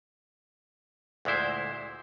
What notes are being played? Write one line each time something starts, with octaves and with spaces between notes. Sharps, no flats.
D2 A#2 G#3 E4 C5